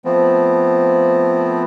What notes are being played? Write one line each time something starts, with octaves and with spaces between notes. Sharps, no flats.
F3 A3 B3 C4